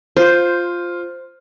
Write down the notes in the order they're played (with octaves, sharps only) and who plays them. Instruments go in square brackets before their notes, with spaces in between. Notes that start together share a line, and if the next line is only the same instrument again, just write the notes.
[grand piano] F4 [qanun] C5